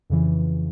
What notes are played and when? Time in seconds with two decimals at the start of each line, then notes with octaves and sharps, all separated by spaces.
0.10 F2 C#3 E3